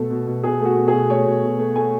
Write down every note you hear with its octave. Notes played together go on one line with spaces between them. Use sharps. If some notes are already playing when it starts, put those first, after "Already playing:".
Already playing: B2 A3 A4
B2
B2
B2 G#4
A3
F#4
B2
G#4
B2
A3 C#5
B2
B2
A3
A3 G#5